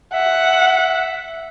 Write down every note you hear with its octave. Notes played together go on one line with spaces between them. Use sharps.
E5 F#5